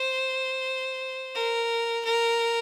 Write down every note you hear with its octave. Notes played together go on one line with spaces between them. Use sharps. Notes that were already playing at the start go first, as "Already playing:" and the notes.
Already playing: C5
A#4
A#4